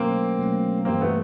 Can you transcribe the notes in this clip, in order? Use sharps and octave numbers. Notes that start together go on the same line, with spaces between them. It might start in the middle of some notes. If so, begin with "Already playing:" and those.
Already playing: B2 F#3 A3 A#3 C4 C#4
B2 F#3 A3 C#4
G2 E3 G3 A#3 C4
A3 B3